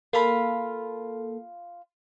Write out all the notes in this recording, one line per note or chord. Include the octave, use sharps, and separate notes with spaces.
A#3 F4 A4 F5 B5